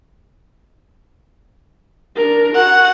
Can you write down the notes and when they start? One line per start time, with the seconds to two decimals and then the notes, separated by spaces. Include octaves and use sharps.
2.17 D4 A#4
2.56 F#4 F#5